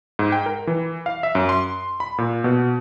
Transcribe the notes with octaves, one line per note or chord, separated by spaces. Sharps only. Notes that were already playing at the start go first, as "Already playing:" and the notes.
G#2
G5
A#4
E3
F5
E5
F#2
C6
B5
A#2
B2